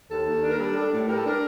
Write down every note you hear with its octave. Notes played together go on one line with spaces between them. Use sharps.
D#2 A4
D#2
D4
A#4
G3 A4
D4
A2
G3 A#4
A4
D4 A#4